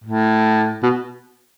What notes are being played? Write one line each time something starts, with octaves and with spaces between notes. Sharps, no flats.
A2
B2